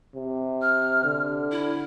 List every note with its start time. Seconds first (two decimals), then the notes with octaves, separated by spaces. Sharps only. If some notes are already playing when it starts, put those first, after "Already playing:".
0.15 C3
0.62 F6
1.04 D3
1.51 E4